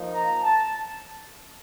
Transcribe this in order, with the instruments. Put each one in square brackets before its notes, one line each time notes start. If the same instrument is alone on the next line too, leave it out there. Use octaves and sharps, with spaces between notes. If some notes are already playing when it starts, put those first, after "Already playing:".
Already playing: [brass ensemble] F3 A#3 D#4
A#5
A5